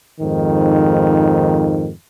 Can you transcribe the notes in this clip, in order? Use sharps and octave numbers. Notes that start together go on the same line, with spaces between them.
F2 G#2 D#3